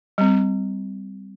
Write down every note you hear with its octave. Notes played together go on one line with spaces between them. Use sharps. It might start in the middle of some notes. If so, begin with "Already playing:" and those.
G3 C4